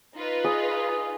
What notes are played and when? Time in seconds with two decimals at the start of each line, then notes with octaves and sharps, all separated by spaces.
0.15 D#4 F4 B4
0.44 G#4 D5 D#5